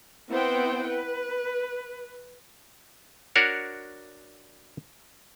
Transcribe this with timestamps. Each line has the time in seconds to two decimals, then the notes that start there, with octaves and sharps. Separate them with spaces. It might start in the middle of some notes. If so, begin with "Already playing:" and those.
0.31 B3 C4 E4 C5 F#5 G5
0.88 B4
3.36 D4 F#4 A#4 C#5 F#5